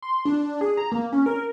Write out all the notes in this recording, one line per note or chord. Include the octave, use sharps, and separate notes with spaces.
C6
D4
G#4
A#5
A#3
C#4
A#4